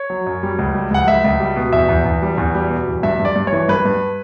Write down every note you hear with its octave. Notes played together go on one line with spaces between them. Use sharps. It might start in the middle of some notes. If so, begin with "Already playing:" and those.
Already playing: C#5
F#3
F#2
G3
C#2
G3
C#2 F#5
C#2 E5
C#2
G3
B2
E2 E5
E2
E2
G3
E2
G3
B2
E2
G2 E5
G2
D5
G2
C#5
E3
G2 B4
G2